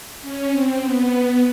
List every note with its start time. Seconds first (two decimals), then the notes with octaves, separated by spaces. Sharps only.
0.22 C#4
0.51 C4
0.81 B3